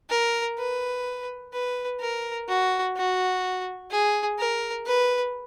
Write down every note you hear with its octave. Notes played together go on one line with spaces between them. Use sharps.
A#4
B4
B4
A#4
F#4
F#4
G#4
A#4
B4